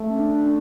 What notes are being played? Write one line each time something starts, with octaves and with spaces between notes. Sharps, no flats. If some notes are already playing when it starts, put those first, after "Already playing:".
Already playing: A3
C#4
D4